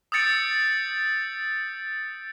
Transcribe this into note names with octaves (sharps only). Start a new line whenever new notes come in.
D#6 E6 G6 A6 C#7 D7